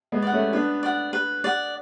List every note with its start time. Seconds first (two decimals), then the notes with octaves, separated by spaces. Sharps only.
0.12 G#3 B3
0.22 D5 F#5
0.32 A3 C#4
0.53 B3 D4 B4
0.83 D5 F#5
1.13 B4
1.44 D5 F#5